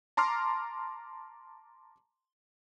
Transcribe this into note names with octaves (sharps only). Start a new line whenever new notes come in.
A5 A#5 C6 D6 F6